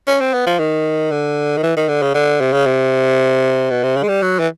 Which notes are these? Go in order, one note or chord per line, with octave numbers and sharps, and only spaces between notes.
C#4
C4
B3
F3
D#3
D3
D#3
E3
D#3
D3
C#3
D3
C3
C#3
C3
B2
C3
C#3
G#3
G3
F#3
E3